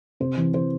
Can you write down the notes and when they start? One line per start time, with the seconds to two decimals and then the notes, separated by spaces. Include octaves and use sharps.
0.20 C3 C5
0.37 E3
0.54 E3 C5